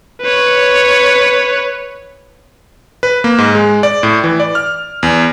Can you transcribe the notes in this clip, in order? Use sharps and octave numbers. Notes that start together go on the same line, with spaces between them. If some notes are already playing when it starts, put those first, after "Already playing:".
B4 C#5
B4
A#3
G#2
G#3
D5
A2
E3
D5
F6
E2